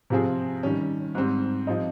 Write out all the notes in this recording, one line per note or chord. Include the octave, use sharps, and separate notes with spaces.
C3 F3 C4 F4 G#4
D#3 G3 C#4
G#2 G3 C4
F3 C4 D#4